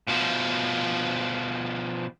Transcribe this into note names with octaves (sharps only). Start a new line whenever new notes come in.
B2 F3